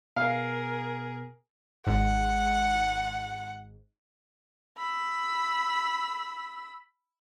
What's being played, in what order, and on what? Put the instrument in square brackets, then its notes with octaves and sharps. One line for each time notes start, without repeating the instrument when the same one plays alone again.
[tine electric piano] B2 B3 [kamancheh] G#4 A#4 [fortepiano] F5
[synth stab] G#1 G#2 [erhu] F#5
[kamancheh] B5 E6